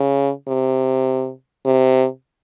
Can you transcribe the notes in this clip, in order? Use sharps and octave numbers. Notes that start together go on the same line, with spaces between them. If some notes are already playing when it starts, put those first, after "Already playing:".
Already playing: C#3
C3
C3